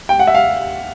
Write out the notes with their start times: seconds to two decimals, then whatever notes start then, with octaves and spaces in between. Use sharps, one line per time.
0.09 G5
0.19 F#5
0.27 E5
0.35 F5